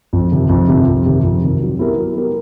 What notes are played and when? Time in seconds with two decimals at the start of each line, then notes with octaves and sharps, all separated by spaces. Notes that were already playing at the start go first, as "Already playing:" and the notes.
0.13 F2
0.32 C3 D#3
0.49 F2
0.68 C3 D#3
0.87 F2
1.06 C3 D#3
1.23 F2
1.42 C3 D#3
1.61 F#3
1.79 B3 E4 G4 A#4
1.98 F#3
2.16 B3 E4 G4 A#4